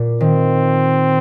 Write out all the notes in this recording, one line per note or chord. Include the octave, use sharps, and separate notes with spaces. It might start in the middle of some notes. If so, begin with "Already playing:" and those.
Already playing: A#2
D#3 C4